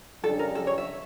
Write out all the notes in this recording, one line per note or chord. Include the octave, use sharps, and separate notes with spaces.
F2 C#3 G3 D4 A4
A#4
A4
C#5
E5